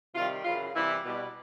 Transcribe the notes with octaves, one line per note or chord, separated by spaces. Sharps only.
C3 D#3 G3 F4
F#2 C#3 E3 F4
C3 E3 G3 E4
B2 G3